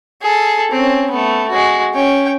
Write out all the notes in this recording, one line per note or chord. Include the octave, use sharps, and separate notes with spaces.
G#4 A4
C4 C#4
A3 B3
G#3 F#4
C#4 G5